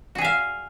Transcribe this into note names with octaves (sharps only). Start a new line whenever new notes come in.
F#4 G#4 E5 F5